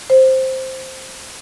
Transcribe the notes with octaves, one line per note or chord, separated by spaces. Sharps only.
C5